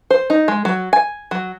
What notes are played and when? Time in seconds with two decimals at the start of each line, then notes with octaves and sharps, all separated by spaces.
0.11 C5
0.30 D#4
0.48 G#3
0.65 F#3
0.93 G#5
1.31 F#3